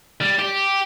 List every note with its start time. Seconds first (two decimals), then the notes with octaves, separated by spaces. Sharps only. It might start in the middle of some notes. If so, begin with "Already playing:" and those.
0.21 G3
0.39 G4